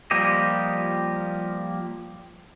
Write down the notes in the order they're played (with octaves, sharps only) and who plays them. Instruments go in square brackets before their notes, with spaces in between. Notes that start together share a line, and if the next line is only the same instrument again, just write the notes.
[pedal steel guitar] F3 G3 A#3 G4 D#5